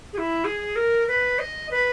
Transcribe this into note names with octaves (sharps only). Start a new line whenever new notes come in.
G#4
E4
G#4
A#4
B4
D#5
B4